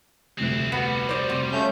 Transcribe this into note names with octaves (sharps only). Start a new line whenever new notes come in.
F1 D2 C4 E4 F#6
G3 B3 F#4
C5 D5
F1 C4
A3 C#4 C#5 F5 A5 G6